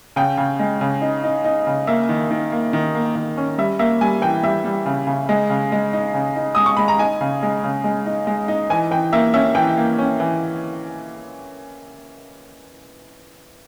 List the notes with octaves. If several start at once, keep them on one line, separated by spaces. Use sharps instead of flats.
C#3 G5
C#3
G#3
C#3
D#4
D#4
D#4
C#3
A#3 E5
D#3
D#3
A#3
D#3
A#3
D#3
C#4
G3 E5
A#3 E5
G3 G#5
E3 G5
G3 E5
G3
C#3
C#3
G#3
C#3
G#3
D#4
C#3
D#4
G#3 D#6
C#6
G#3 B5
A#5
D#4 G#5
C#3
G#3
C#3
G#3
D#4
G#3
D#4
E3 G#5
E3 G5
A#3 E5
C#4 E5
E3 G5
A#3
C#4
E3